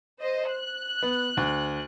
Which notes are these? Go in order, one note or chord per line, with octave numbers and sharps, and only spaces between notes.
C5 D#5
F#6
B3
D2